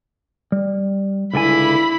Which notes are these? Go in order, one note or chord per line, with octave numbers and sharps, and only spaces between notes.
G3
C#2 D3 E4 G#5 B5